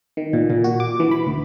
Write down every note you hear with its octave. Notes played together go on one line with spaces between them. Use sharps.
D#3
A#2
A#2
F#4
D6
E3
B5
D2